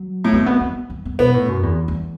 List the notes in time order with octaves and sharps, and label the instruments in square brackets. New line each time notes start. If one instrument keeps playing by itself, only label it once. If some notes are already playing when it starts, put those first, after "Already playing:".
Already playing: [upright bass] F#3
[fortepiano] A2
[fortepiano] B2 [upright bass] A3
[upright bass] B3
B3
B3
B3
[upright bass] B2 [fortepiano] B3
[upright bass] A2
F#2
E2
E2